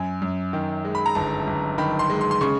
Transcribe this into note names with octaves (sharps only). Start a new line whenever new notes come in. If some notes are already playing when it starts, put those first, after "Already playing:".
Already playing: F#2 G#5
F#2
D#3
G#3
B5
A#5
G1 A5
G1
D#3 B5
C6
G#3
C6
C6
C#3 C#6